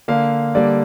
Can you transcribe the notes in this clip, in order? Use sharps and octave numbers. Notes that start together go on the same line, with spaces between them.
D3 A#3 F5
D3 G3 A#3 D5